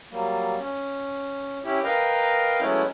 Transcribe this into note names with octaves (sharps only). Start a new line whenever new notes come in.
F#3 G3 A#3
C#4
C#4 E4 G4
A#4 B4 D#5 F5 G5 A#5
F#3 G#3 A3 B3 C#4 E4